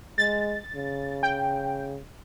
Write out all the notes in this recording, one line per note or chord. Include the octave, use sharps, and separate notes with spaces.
G#3 A6
C#3
G5